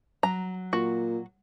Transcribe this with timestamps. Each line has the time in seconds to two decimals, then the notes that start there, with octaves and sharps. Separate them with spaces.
0.23 F#3 A#5
0.73 A#2 F#4